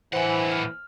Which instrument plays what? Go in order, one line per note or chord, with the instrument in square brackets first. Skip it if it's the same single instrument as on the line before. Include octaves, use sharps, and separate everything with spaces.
[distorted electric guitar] A2 F#5 [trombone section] E3 [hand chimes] C5 G#5
[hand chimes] F6